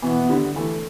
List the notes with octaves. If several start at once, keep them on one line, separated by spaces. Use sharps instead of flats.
B2 E3 B3
D3 G3
E3 A3